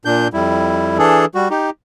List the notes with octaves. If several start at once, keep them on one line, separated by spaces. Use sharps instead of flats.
A#2 D4 G6
F2 G3 E4
E3 D4 G#4 A4
G3 F#4
D#4 G4